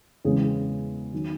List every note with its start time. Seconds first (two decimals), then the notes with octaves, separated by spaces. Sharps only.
0.25 E2 C#3 G#3 G#4
1.13 D#3 F#3